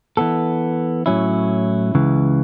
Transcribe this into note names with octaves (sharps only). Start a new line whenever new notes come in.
E3 B3 A4
A2 F#3 C#4 E4
C#2 C#3 E3